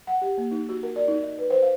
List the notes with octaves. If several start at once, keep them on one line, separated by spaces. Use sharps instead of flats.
F#5
G4
A#3
D#4
F#4
A#4
D5
D#4
D#5
B4
C5
F5